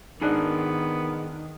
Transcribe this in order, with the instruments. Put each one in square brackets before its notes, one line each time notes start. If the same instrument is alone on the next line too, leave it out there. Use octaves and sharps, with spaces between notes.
[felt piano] G#2 D4 F#6 [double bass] D#3 [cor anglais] B3 [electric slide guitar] D#4 G#4 A#4